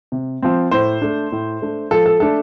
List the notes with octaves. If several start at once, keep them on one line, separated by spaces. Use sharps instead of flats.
C3
F3 C4
A2 C5
A3 D4
A2
A3 D4
F3 A4
A4
A3 D4 A4